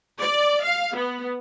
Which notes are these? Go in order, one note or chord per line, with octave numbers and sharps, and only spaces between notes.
D5
F5
B3